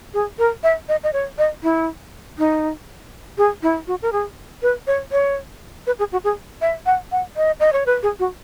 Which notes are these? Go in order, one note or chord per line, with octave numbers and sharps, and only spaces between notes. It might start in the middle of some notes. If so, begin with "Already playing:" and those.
G#4
A#4
E5
D#5
D#5
C#5
D#5
E4
D#4
G#4
E4
F#4
A#4
G#4
B4
C#5
C#5
B4
G#4
F#4
G#4
E5
F#5
F#5
D#5
D#5
C#5
B4
G#4
F#4